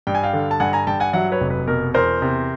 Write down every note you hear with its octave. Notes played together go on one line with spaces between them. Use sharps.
G2 G5
G#5
F5 G5
D3
A5
G2 F#5 G#5
G#5 A#5
G2 G5 A5
F#5 G#5
F#3 E5 F#5
B4 C#5
F1
B4
B2 A#4
E2 A#4 C5
C3